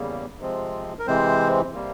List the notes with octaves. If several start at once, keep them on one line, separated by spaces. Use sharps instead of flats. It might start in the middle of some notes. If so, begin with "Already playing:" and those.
Already playing: E2 C#3 G3 A#3
C3 F3 G#3 C4
A#4
C3 E3 G#3 C4 C5
C3 G3 A#3